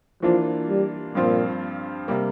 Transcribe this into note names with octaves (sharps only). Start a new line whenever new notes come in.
E3 F3 A#3 D4 F4
G3
G2 A#2 F3 C4 F4
C3 G3 A#3